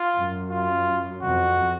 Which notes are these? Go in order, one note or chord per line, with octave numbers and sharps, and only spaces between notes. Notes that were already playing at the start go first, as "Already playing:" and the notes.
Already playing: F4
F#2
F4
F2 F#4